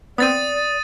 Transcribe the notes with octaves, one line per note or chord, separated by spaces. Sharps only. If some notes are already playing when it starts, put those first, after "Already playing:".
B3 C4 D5 D#6 A6 D#7